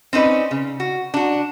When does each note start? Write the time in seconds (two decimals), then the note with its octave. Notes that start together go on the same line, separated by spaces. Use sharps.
0.13 C4 C#4 D#4 B4 D5
0.51 C#3
0.80 F#4
1.14 D4 F#4